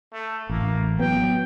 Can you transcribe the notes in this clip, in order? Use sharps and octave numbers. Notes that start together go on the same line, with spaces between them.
A3
A1 A#3
F#3 B3 G5